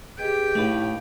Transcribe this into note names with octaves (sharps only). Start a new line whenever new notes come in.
G4 G#4 B4 D#5 G5
A2 A3 D#4 B4 F5